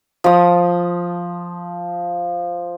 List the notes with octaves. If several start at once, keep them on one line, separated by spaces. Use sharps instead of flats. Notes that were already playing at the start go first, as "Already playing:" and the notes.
F3 D#6